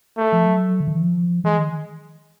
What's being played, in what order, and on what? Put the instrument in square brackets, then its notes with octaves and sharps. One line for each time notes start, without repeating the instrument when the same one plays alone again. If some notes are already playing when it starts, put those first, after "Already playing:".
[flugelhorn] A3
[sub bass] F3
F#3
D3
D#3
E3
F3
[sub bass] E3 [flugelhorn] G#3
[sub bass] D#3